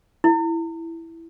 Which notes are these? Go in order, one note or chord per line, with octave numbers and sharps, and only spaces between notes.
E4